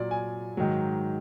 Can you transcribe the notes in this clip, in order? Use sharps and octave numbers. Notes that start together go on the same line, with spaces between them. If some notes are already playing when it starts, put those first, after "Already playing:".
Already playing: A#2 F#3 D5
G#5
G#2 D#3 F#3